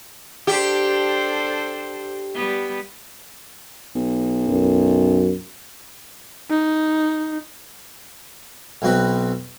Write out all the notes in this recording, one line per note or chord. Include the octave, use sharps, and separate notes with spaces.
D4 G4 A4 C5
G3 B3
B1
F#2
D#4
B1 B2 C4 F#4 B4